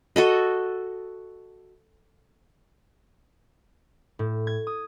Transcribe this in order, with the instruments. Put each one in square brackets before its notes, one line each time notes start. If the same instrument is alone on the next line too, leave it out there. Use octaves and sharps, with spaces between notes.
[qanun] F#4 A4 D#5
[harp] A2
G#6
D#6